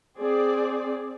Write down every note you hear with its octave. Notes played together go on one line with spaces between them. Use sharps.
C4 G#4 D5